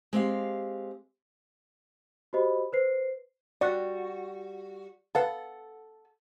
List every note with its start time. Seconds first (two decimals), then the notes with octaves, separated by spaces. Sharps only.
0.13 G#3 C4 G4 F5
2.33 F#4 G4 C5 D#5 B5
2.73 B4 C5 C7
3.61 G3 F#4 D5 C#6 F#6
5.15 A4 B4 F5 F#5 A5